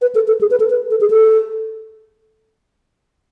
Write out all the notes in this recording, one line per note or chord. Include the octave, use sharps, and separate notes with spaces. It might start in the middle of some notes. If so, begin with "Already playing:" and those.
B4
A4
A4
G#4
B4
A4
B4
A4
G#4
A4